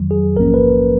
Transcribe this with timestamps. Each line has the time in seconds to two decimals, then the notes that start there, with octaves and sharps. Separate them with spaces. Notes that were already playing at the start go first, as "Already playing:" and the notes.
Already playing: F2 D#3 F#3
0.11 G#4
0.36 A#1 G#2 F3 A#3 C#4 A#4
0.54 B4